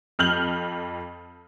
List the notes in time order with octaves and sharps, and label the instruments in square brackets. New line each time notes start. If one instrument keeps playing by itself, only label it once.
[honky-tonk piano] F2 F6 G6 F#7